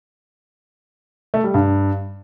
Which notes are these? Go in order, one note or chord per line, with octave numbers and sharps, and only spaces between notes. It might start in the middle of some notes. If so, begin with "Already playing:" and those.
A3
G3
G2